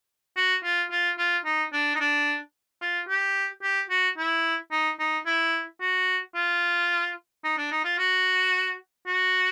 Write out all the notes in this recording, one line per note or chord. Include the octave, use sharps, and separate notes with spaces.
F#4
F4
F4
F4
D#4
D4
D#4
D4
F4
G4
G4
F#4
E4
D#4
D#4
E4
F#4
F4
D#4
D4
D#4
F4
F#4
F#4